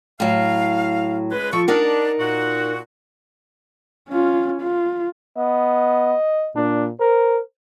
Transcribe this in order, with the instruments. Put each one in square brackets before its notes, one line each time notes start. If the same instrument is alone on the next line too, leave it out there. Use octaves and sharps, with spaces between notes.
[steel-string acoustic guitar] A2 F#3 [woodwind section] F5
[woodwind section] C#2 G#3 B4
[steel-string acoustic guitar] F3 [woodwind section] A4 C#6
[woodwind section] D4 [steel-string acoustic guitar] D#4 A#4 F#5
[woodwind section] A#2 F#4
[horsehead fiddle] C#4 F4
F4
[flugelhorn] B3 [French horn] D#5
[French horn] A#2 [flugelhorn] D4
[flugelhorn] A#4 [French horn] C5